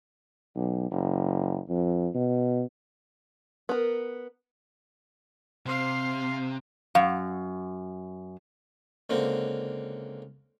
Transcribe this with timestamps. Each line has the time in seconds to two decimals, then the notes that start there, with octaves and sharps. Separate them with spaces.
0.56 B1
0.91 F#1
1.69 F2
2.15 B2
3.69 B3 A#4
5.66 C3 F5 C6
6.95 F#2 F5
9.10 C#2 D3 A#3 C4